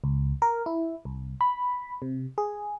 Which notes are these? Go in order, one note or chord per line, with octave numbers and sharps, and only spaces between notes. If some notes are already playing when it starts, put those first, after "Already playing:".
C#2
A#4
E4
C2
B5
C3
G#4